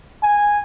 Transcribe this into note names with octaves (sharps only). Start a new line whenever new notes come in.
G#5